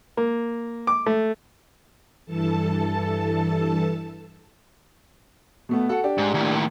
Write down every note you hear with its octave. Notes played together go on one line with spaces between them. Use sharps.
A#3
D6
A3
G2 E3 A4 A5
B2 A3 B3
F#4 A4 F#5
D4 G4
G#2
D#2 A2